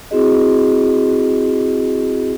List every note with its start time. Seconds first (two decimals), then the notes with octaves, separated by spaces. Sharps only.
0.11 C4 E4 F#4 G#4 D#5